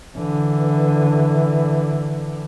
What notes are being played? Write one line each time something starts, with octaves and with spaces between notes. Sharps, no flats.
D3 E3